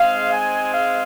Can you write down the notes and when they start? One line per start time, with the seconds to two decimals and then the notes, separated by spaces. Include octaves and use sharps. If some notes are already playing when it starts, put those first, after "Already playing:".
Already playing: G#2 G#3 C4 F5
0.32 G#5
0.74 F5